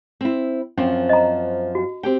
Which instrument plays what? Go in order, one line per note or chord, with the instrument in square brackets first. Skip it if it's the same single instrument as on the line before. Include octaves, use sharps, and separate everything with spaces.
[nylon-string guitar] C4 E4
[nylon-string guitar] F#2 F3 C4 [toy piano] C#4
[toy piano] D#5 A#5
F#4
[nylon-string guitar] C4 G4 G5